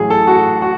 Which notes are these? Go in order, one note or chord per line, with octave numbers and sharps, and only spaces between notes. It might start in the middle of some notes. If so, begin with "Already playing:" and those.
Already playing: A1 A2 F#3 G#4
A4
F#4
F#4